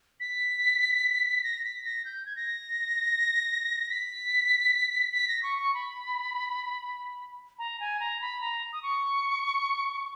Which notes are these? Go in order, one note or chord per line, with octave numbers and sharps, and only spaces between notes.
B6
A#6
B6
A#6
G6
G#6
A#6
B6
B6
A#6
C#6
C#6
B5
A#5
G#5
A#5
B5
A#5
D#6
C#6